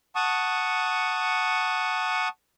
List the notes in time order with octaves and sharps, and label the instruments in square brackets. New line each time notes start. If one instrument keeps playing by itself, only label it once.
[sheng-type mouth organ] F#5 A5 C#6 D#6